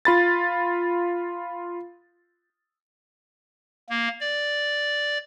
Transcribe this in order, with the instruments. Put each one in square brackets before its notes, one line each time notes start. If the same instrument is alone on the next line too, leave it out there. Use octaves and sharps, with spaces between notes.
[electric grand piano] F4 B5 A6
[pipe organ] A#3
D5